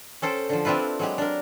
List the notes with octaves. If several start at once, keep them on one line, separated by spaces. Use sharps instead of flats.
C#4 A4 C5 G5
D3 F3
C4 D4 E4 F4 B4
F#3 G#3 G4
D4 A#4